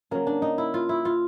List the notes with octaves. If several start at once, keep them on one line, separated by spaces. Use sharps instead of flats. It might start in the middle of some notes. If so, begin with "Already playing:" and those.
C#3 F#3 A#3
D4
D#4
E4
F4
E4
F4